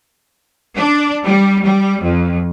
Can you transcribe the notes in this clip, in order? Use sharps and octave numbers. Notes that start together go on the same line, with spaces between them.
D4
G3
G3
F2